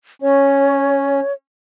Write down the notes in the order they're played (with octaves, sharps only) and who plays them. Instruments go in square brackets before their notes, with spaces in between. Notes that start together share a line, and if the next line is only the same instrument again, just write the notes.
[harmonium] C#4 [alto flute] C#5